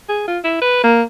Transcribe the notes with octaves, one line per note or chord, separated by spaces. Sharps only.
G#4
F4
E4
B4
A#3